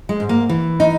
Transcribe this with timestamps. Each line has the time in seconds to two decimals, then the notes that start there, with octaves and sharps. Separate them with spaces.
0.09 G#3
0.20 G#2
0.29 A#3
0.49 E3
0.80 D#4